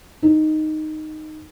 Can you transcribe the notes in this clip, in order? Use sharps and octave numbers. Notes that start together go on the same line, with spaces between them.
D#4